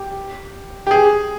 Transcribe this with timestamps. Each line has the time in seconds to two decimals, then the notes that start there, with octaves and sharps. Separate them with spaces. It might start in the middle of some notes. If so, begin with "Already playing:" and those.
Already playing: G4
0.87 G4
0.91 G#4